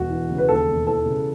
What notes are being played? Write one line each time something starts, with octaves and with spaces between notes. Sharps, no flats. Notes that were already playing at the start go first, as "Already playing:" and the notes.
Already playing: E1 F#4
E3
C#3
B4
D#2 A4
E1
E3 A4
C#3